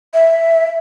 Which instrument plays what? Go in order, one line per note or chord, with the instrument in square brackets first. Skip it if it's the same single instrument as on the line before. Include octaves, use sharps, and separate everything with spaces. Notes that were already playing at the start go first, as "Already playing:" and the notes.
[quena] E5